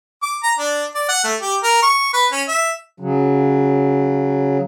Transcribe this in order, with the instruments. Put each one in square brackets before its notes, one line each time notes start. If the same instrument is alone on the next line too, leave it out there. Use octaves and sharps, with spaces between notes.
[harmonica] D6
A#5
D4
D5
F#5
A3
G4
A#4
C#6
B4
C#4
E5
[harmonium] C#3 F#3